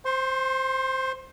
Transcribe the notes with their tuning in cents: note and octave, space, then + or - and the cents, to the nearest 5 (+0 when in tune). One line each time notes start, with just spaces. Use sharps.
C5 +0 C6 +35